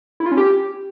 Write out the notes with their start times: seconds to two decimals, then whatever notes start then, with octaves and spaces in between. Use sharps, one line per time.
0.20 E4
0.26 F4
0.32 C#4
0.37 G4